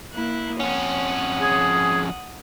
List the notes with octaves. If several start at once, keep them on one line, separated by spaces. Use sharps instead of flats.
A#3 E4 F#6
F2 C#4 F#5 D#6
G#4